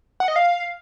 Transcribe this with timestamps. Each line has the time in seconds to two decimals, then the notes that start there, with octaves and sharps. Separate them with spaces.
0.20 F#5
0.28 D#5
0.36 F5